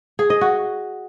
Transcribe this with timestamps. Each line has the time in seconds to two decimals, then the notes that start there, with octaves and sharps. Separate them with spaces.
0.19 G#4
0.30 D#5
0.41 F#4